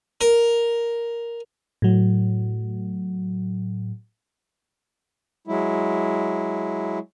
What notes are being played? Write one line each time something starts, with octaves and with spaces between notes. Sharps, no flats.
A#4
A2 F#3
F#3 G#3 E4